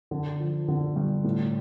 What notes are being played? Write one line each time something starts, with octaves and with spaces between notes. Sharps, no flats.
D3
F3
D3
G2
A2